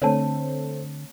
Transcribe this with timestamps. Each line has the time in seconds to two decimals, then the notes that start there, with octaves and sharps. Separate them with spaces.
0.02 D3 A3 C4 C#5 A5